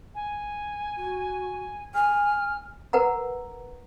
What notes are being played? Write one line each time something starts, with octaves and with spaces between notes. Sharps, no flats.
G#5
F#4
G#5 F6
A#4 B4 F#5 A#5